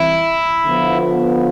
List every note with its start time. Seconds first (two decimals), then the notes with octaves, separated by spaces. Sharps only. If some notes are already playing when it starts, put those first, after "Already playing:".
Already playing: C2 C3 E3 E4
0.64 D3 F3 B3 F4